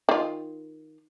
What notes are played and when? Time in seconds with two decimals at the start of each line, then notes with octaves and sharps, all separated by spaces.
0.09 D#3 F4